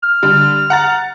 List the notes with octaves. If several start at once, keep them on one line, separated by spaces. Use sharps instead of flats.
F6
D3 G3
F#5 A#5 A6